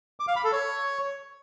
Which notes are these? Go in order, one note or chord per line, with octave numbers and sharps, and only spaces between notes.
D6
F5
B5
A4
C#5